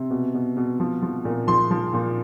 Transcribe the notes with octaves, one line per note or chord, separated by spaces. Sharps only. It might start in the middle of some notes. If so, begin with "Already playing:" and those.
Already playing: C3
B2
B2
B2
F3
F3
A#2
F3 C6
F3
A#2